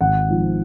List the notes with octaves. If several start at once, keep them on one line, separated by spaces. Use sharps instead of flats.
G#1 F#5
G#2 F3